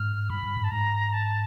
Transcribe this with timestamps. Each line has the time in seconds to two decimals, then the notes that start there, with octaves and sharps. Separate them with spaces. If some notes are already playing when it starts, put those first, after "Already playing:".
Already playing: G#2 F6
0.30 G2 B5
0.43 G2
0.57 G#2
0.64 A5
0.71 G#2 A#5
1.13 A5